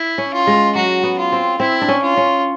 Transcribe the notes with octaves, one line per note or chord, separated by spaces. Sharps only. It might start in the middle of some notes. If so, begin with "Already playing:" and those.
Already playing: E4
C#4
F4
G#3
F#3 F#4
B3
F4
C4
C4 E4
D4
C#4
F4
C#4